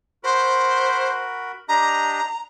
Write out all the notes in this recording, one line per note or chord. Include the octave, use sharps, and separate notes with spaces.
F#4 A#4 C5 B5
D4 G4 D#5 A#5